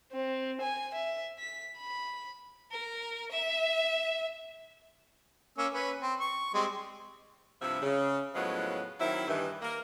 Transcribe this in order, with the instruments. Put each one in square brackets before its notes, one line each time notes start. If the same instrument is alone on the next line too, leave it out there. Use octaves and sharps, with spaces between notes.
[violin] C4
G#5
E5
B6
B5
A#4
E5
[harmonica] A#3 C#4 E6
C#4 B4
C4
C#6
G3 G#3 C4
[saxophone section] G2 C3 F3 E4 E5
C#3
A2 C#3 F3 F#3 G#3 B3
D#3 F#3 C4 E4
G2 D#3 E3
A#3 A#4